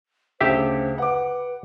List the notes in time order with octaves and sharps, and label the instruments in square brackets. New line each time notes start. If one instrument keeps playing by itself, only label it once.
[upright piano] D2 C#3 [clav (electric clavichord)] G4 E5 [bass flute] C5
[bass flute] B4 [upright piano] F#5 D6